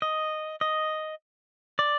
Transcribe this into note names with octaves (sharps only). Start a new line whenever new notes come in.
D#5
D#5
D5